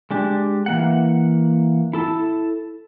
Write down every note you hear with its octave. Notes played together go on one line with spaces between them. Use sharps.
G#3 D4 G4
E3 A#3 F#5
E4 A4 A5